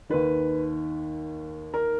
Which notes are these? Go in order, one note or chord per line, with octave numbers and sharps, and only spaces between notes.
D#2 D#3 B4
A#4